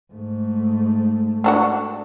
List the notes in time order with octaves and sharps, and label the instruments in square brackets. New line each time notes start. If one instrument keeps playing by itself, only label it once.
[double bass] G#2 A3
[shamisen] A3 D4 F#4